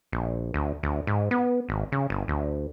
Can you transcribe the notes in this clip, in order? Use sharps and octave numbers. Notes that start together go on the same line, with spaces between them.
A#1
D2
D2
G#2
B3
G#1
C#3
G1
D2